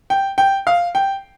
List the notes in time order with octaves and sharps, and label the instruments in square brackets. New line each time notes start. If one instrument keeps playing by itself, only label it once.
[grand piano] G5
G5
F5
G5